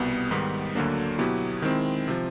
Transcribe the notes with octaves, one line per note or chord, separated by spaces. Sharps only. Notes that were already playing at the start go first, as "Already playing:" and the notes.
Already playing: C2 B2 G3 B3
G#2 D#3 G3 B3
D2 D3 F#3 A#3 D4
B2 F#3 B3 E4 G4
D#3 G#3 C4 E4
C3 F3